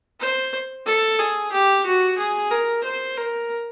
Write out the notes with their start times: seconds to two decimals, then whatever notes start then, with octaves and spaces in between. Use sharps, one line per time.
0.20 C5
0.86 A4
1.19 G#4
1.52 G4
1.86 F#4
2.18 G#4
2.51 A#4
2.84 C5
3.17 A#4